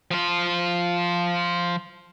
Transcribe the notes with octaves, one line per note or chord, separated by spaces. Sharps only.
F3 F4